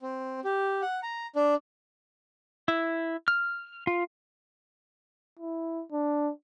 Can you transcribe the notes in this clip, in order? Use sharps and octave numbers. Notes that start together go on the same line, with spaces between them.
C4
G4
F#5
A#5
D4
E4
F6
F4
E4
D4